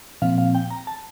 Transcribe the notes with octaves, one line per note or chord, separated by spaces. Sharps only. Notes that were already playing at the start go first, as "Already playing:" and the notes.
A#2 F3 C4 F5
F5
G5
A#5
A5